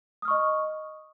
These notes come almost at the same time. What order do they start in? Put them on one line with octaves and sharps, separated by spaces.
D#6 F6 C#6 D#5